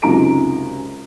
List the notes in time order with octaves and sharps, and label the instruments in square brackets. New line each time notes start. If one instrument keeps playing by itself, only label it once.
[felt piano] C#2 F#2 C3 D#4 A#5 D7